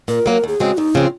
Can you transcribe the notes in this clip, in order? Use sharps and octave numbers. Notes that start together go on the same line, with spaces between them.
A#2 A#4
F#3 A#3
D#2 G#4
C#3 G#3 C4 F#4
D#2 D#4
C#3 F3 C4 F4